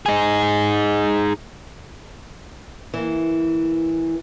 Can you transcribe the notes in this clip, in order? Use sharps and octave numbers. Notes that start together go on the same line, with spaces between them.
D#4 G#4
E3 A#3